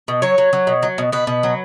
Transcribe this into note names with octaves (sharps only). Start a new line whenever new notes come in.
B2
F#3 C#5
F#3
F#3
B2
F#3
B2
B2 B4
B2
F#3